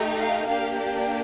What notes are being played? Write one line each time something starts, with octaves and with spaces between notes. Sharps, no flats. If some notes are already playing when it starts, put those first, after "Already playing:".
Already playing: A3 D#4 G4
F5
A#3 D4 G4 F5
D5